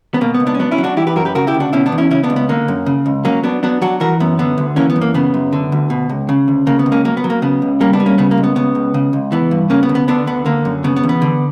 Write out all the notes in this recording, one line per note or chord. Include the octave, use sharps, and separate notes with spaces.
B3
B2 A#3
B3
C#2
B3 D4
C#4
F#3 B3 D4
C#4 E4
F#3
D4 F#4
E3 E4 G4
G4 B4
F#2 F#4 A#4
G4 B4
C#3 F#4 A#4
E4 G4
D2
D4 F#4
B2 C#4 E4
B3 D4
E2
C#4 E4
C#3 C#4 E4
B3 D4
C#2
B3
D3 A#3
F#2
C#3
C#2
F#3 A#3 C#4
F#3 B3 D4
F#3 B3 D4
F#3 D4 F#4
E3 F#4 A#4
F#2 B3
D3 B3
D2
E3 A#3 C#4
B3
F#2
A#3
C#3 B3
F#2
D3
D2
B2
C#2
C#3
D2
C#3 A#3
B3
C#2
A#3 C#4
F#3 A#3
B3
F#3
A#3
C#3 B3
C#2
G3 A#3 C#4
B3 D4
G3
A#3 C#4
C#3 B3
A#3
C#2
B3
C#3 B3
C#2
C#3
C#2
E3 B3
G2
C#3 A#3 C#4
B3
D2
B3
D3 B3 D4
D2 B3
D3 A#3
F#2
C#3 B3
B3
E2
B3
D3